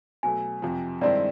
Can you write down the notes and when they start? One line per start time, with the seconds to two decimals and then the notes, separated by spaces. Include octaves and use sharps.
0.23 B2 F#3 A3 G#5
0.62 F2 C3 F3
1.01 G2 D#3 G#3 C4 E4 D5